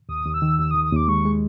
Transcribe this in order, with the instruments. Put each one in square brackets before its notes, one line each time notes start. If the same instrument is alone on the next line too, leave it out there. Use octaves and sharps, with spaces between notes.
[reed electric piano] D#2 [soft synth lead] D#6
[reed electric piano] D#2
[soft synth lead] E6
[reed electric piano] D#3
[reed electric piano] D#2 [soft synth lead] E6
[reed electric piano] D#2 [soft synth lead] D#6
[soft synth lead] D#6
[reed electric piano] D#2 [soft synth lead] D6
[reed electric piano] G#3 [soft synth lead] C#6
[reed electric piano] G#3